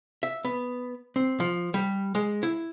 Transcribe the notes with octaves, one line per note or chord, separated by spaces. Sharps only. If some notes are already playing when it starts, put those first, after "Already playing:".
E5
B3
C4
F3
G3
G#3
E4